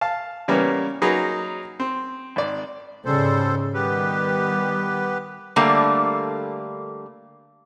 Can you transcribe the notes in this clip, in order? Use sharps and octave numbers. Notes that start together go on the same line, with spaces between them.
F5 A5
C#3 E3 G3 A#3 B3 C#4
F#3 A#3 D#4 G#4 B4
C4
G#1 D5
G#2 C#3 G3 A4 C5
D#3 G3 B3 G4 B4
D3 G3 A3 A#3